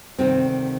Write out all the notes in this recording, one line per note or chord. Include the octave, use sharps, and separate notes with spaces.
D2 C3 D#3 G3 C4